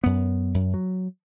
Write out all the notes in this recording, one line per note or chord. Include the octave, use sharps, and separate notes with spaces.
F#2 B3
F#2
F#3